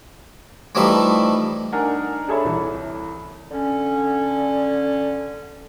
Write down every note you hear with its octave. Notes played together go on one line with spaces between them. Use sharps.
E3 F3 G3 A3 D#4 E5
D4 D#4 A#4 F#5 G#5
D4 G#4 A4 C#5 E5 B5
C2 E3
D3 C#4